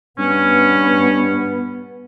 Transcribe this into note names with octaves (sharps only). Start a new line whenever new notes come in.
G2 B3 C#4